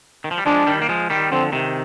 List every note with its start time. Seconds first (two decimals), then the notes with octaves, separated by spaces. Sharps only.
0.24 D#3
0.31 F3
0.38 G3
0.46 F3 G#3 D4
0.67 D#3 G3
0.82 A#3
0.89 F3 G#3
1.10 D#3 G3
1.31 D3 F3 C4
1.52 C3 D#3